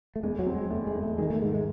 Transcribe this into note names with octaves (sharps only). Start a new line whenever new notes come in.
A3
E2 G#3
F#3
C4
G#3
E2 A3
G#3
E2
A3
D#3 G#3
A3
G#2 G#3
G#3